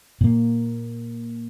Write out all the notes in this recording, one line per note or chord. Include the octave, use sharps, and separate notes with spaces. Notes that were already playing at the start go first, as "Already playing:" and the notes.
A#2 A#3